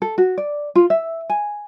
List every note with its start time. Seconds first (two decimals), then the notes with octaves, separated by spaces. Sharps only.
0.02 A4
0.18 F#4
0.38 D5
0.75 F4
0.90 E5
1.30 G#5